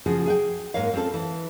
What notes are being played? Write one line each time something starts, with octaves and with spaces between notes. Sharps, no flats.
C#3 F3 F#4 G#4
G#4 F#5 G5
G#2 A#3 A#4 C#5 F5
C4 C#4 F4 F#4 A4
E3